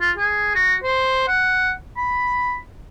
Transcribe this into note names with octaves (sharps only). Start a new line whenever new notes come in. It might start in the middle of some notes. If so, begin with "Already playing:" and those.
F4
G#4
F#4
C5
F#5
B5